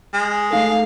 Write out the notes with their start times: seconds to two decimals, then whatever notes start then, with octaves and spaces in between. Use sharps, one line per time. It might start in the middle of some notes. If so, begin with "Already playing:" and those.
0.13 G#3
0.51 A3 D#4 A4 F5